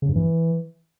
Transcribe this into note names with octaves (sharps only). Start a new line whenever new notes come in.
C#3
G2
E3